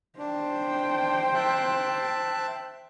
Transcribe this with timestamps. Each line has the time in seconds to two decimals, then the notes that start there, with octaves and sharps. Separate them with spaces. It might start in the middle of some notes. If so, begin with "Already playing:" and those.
0.19 D4 C5 G5
1.35 E5 A5 F#6